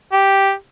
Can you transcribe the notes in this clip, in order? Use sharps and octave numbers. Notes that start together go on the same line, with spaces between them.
G4